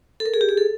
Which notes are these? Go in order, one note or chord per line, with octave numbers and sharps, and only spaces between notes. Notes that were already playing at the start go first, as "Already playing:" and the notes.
A4
A#4
G#4
G4
G#4
A4